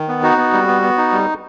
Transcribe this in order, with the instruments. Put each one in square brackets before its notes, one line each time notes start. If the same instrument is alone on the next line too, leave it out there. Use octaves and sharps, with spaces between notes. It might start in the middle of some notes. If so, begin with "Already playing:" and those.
Already playing: [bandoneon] D#3
B3
D#4 F#4
B3
G3
B3
B3
D#4
G3